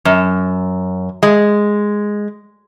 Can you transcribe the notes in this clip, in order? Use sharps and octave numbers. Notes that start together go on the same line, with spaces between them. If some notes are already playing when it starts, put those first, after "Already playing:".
F#2
G#3